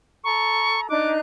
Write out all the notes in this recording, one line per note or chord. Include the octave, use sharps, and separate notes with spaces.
A4 A#5 C#6
D4 D#4 D6 F#6